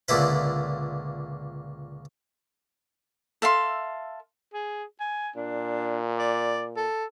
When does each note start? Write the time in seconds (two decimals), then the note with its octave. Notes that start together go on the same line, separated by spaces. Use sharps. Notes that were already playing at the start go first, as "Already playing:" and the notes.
0.08 C#2 A#2 D3 E4 B4
3.42 A4 E5 F5 C6
4.54 G#4
5.00 G#5
5.36 A#2 D4
6.19 D5
6.77 A4